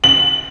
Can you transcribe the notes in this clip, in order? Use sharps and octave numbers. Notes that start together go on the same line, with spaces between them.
F#7